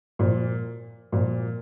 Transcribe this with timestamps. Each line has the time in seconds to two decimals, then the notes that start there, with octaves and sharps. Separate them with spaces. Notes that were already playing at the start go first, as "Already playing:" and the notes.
0.19 A#2 F3
1.12 A#2 F3